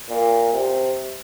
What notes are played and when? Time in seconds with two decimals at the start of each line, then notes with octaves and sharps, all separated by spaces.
0.09 A#2
0.53 C3